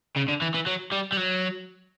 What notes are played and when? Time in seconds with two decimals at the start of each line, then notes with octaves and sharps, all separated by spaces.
0.17 C#3
0.28 D3
0.42 E3
0.54 E3
0.66 F#3
0.92 G3
1.12 G3
1.17 F#3